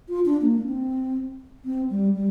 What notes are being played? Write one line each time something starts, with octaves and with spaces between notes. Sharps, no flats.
F4
D4
A#3
D4
C4
C4
G3
G3